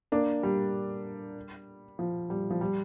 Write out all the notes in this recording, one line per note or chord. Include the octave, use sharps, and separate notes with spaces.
A#3 D4
G3
F3
G3
F3
G3